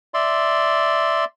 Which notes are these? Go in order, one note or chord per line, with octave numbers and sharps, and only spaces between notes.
D5 E5 C6